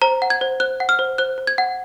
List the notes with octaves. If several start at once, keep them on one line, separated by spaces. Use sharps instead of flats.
C5 A#5
F#5
G#6
C5
C5 F#6
F#5
F6
C5
C5 F#6
C5
G#6
F#5